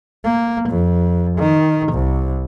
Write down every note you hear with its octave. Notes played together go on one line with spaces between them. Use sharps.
A#3
F2
D#3
C2